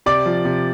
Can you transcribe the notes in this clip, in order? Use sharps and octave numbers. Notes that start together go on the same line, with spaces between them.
C3 D5 D6
F3
C3